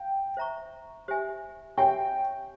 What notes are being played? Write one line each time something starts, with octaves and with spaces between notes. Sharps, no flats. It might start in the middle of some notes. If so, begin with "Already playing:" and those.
Already playing: F5 G5
C5 E5 A#5 C#6
G4 C5 E5 G#5
G4 C#5 E5 G5 G#5 C#6